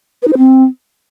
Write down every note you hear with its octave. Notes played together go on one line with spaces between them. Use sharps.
B4
D#4
C5
C4